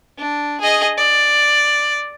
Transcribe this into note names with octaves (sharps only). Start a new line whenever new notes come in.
D4
G#4 D#5
D5